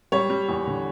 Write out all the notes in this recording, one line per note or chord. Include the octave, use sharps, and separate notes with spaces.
G3 C#5
G3
E2
D3